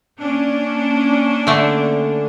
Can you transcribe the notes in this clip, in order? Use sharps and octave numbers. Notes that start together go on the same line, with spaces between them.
A#3 C#4 D4
D3 A3